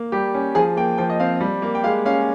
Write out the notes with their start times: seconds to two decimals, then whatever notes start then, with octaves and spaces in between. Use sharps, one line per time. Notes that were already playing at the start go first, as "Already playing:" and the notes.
Already playing: A#3
0.12 G3 G4
0.34 C#4
0.55 F3 G#4
0.77 A#3 G5
0.98 F3 G5
1.10 D#5
1.20 C4 F5
1.41 G3
1.62 A#3
1.75 G5
1.84 G#3 F5
2.05 C#4 F5